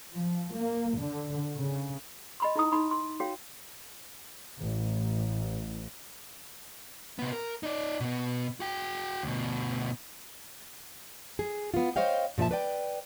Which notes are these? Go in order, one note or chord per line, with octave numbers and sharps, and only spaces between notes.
F3
A#3
D3
C#3
D#5 B5 C6
D#4 E4 A#5 D#6
D#4 B5 C6
C6
F#4 C#5 F5 G5
A1
C3 B3
A#4
D#4 D5
B2 B3
F#4 G5
D2 B2
G#4
B3 F4
C5 C#5 D#5 F5 G5
A#2 F3 G#4 E5 A5
B4 D5 G5